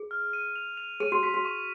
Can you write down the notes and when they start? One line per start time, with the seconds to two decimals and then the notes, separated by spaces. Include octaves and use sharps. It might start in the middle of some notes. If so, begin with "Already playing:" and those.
Already playing: G#4
0.11 F6
0.33 D#7
0.56 F7
0.77 F7
1.00 G#4 D#7
1.12 F#4
1.23 F#4 B6
1.34 F#4
1.45 C#6